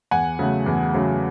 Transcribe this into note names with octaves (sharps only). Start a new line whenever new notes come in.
E2 F#5 G#5
C#3 F#3 A3
E2
C#3 F#3 A3